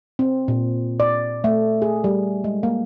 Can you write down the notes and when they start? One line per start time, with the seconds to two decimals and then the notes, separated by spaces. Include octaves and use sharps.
0.19 C4
0.48 A#2
1.00 D5
1.44 A3
1.82 G#4
2.04 G3
2.44 G#3
2.63 A#3